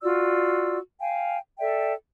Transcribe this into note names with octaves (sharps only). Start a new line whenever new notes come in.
F4 F#4 D5 E6
F5 G5 G#5
A4 D5 E5 G5